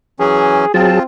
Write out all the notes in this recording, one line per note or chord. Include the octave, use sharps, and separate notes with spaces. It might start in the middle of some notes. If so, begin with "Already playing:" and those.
E3 F#3 C#4 G#4
F#3 C4 F4 G#4 A5